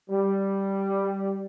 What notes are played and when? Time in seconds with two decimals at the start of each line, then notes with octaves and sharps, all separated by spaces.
0.10 G3